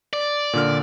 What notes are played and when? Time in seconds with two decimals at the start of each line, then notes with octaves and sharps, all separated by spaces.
0.13 D5
0.53 A#2 D3 F6